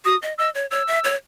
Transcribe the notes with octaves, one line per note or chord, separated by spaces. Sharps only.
F#4 D#6
D#5
D#5 E6
C#5
C#5 E6
E5
C#5